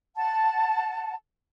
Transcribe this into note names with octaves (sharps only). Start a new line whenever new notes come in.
F#5 A5